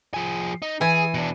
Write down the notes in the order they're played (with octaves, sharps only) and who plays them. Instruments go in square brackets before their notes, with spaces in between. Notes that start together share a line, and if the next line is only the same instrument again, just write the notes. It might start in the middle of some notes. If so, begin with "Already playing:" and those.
[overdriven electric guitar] F3 G#4
D#4
[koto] E3 G#5 [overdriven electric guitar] G#4
[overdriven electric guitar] B2 D4